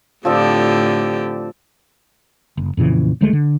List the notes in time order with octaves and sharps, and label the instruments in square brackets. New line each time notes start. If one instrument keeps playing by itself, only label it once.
[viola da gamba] A2 D3 G4 [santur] F3 C4 D5
[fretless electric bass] F#1
F2 A#2 C#3 E3
D2 G#3 A3
D3